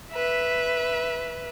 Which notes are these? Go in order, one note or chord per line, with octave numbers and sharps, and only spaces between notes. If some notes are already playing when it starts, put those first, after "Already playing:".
B4 E5